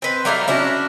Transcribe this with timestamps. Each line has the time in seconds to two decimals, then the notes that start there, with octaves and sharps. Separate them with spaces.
0.02 C4 B4
0.25 F#3 G3 A3 F5
0.48 C#4 D4 E4 F#4